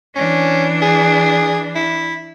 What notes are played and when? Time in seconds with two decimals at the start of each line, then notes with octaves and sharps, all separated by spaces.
0.16 E3 C#4 D4
0.82 G#4
1.75 E4